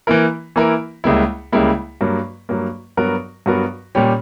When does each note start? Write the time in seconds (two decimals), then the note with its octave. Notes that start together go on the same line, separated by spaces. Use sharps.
0.07 E3 A#3 E4 A#4
0.56 E3 A#3 E4 A#4
1.04 C#2 C#3 G3 A#3 E4
1.52 C#2 C#3 G3 A#3 E4
2.01 G2 F#3 A#3
2.49 G2 F#3 A#3
2.97 G2 F#3 B3 F#4 A#4
3.46 G2 F#3 B3 F#4 A#4
3.95 A#2 G3 C#4 G4